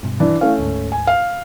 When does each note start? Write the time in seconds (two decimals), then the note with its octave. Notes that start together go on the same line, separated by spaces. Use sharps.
0.03 G2 B2
0.20 E3 D4
0.41 A3 C#4 E4 F5
0.59 D2 G#2
0.92 G#5
1.07 F5